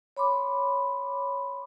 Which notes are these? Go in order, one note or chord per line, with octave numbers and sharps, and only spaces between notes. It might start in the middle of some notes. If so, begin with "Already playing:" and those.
C#5 B5 C6 D6